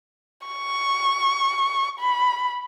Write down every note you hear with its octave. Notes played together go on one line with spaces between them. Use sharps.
C#6
B5